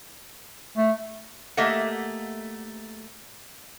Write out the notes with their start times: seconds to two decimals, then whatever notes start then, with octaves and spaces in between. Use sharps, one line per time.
0.77 A3
1.57 A3 A#3 G4 D#5 E5 F#5